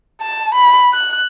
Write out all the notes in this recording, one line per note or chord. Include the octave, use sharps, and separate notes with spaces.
A5
B5
F#6